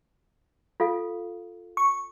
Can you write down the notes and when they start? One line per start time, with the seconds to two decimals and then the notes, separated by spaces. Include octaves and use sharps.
0.80 F4 A4 F5
1.77 C#6